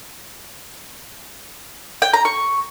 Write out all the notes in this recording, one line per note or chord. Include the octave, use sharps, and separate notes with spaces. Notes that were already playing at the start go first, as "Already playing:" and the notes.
G5
A#5
C#6